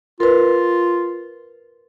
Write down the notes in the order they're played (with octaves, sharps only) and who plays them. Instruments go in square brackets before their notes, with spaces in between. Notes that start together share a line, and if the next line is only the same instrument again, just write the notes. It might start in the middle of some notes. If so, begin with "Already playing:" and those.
[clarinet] F4 [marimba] A#4 B4